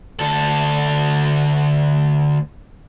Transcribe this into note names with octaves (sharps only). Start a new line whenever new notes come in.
D2 A4